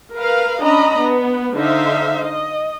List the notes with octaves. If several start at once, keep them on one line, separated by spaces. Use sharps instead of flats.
A#4 B4 F5
C#4 D4 D#5 A#5 B5
B3
D3 D#4 C5 E5 F5
D#5